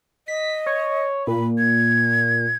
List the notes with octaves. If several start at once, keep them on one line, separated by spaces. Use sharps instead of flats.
D#5 B6
C#5
A#2 B5
G#6